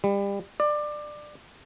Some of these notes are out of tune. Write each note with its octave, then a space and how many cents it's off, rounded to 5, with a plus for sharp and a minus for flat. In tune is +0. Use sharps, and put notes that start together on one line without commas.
G3 +30
D5 +20